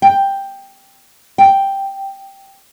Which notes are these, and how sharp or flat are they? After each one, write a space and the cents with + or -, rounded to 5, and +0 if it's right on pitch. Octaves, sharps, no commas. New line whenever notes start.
G5 +5
G5 +0